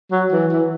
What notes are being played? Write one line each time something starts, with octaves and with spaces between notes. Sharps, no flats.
F#3
E3
E3